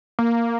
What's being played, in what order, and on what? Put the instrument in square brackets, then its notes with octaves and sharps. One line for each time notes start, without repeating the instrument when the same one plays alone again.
[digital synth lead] A#3